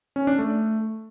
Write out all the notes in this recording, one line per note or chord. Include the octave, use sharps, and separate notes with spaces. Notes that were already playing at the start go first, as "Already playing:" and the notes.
C#4
D4
A3